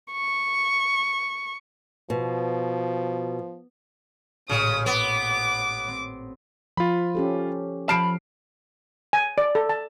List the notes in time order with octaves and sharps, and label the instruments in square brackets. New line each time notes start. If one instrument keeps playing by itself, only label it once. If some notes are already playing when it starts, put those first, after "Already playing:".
[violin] C#6
[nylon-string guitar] B2 [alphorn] F3
[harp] A1 A#2 C#5 [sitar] C#3 [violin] D#6
[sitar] B3 [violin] D6
[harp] C4
[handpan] F3 [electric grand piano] F4 B5
[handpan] C#4 G4 A4
[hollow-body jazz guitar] F3 A5 [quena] B5 [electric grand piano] F6 C7 D7
[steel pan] G#5
D5
A4
A5